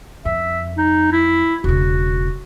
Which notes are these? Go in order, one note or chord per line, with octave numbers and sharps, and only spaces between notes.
F2 E5
D#4
E4
E1 C#3 F#4